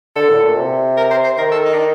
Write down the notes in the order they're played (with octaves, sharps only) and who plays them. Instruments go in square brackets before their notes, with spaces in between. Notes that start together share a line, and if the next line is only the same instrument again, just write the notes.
[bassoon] D3 [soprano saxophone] A4
[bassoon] A2
A#2
C3
[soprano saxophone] A#4
C5
C5
[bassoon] D#3 [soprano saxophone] A#4
[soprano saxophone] A4
D#4
D4
D#4